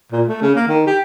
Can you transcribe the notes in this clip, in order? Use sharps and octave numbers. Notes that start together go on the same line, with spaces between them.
A#2
A3
C#3
A#3
D#3
G4